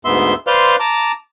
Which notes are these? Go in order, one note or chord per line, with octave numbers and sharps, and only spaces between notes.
D2 G#2 B3 E5 C6
B4 C5 D5 F5 C6 F6
A5 A#5 D6